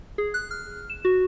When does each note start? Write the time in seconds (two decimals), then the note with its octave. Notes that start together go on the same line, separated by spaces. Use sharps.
0.18 G#4
0.34 F#6
0.51 F6
0.90 E7
1.05 F#4